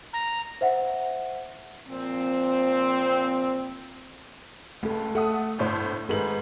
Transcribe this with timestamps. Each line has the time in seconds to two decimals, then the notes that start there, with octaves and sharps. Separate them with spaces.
0.13 A#5
0.61 C5 E5 F#5
1.89 A#2 F3 C4
4.83 C#2 A3 A4
5.15 A3 A4 F#5 D#6
5.59 G1 A2 C5
6.09 G#2 D#3 G#4 A4 B4 F#7